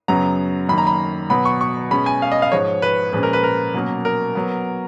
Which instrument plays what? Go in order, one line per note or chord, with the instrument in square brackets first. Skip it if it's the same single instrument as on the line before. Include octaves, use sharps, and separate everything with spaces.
[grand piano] F#2 C#3 F#3 B3 A#5
F#2 D#3 A#3 B5
A#5
B5
B2 F#3 B3 B5
C#6
C#6
B2 G#3 C#4 B5
G#5
F5
D#5
F5
G#2 F3 G#3 C#5
B4
A#2 F3 G#3 C#4 B4
A#4
B4
A#4
B2 F#3 A#3 C#4
A#4
F#3 B3